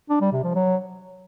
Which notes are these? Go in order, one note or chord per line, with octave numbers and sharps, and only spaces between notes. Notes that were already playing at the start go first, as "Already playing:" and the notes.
D4
G3
C3
F3
F#3